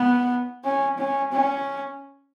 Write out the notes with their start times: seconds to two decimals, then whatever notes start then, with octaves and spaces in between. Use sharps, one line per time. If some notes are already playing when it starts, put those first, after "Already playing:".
Already playing: B3
0.64 C#4
0.98 C#4
1.32 C#4